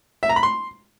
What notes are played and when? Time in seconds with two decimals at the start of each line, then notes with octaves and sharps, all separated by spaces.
0.23 E5
0.29 A#5
0.36 B5
0.43 C6